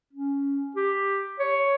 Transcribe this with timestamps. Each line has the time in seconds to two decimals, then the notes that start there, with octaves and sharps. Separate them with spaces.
0.13 C#4
0.76 G4
1.39 C#5